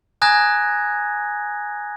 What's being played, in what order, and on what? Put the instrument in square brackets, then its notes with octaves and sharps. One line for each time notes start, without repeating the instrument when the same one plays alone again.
[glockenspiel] G#5 A#5 D#6 F#6 G#6 A#6